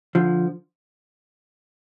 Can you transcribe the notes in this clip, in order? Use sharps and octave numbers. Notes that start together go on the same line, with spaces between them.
D3 F3